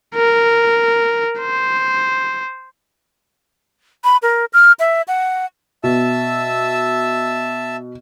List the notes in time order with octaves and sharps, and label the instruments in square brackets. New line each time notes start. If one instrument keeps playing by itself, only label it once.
[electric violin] A#4
C5
[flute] B5
A#4
F6
E5
F#5
[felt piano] B2 [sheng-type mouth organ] E5 A5 E6